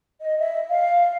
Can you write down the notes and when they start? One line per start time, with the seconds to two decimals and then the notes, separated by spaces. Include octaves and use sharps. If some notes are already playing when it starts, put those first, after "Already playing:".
0.22 D#5
0.39 E5
0.69 F5